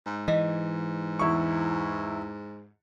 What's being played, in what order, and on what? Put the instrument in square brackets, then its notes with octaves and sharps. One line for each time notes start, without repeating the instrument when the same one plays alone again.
[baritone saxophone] G#2
[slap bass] E3 [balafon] D#5
[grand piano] E2 E4 C#6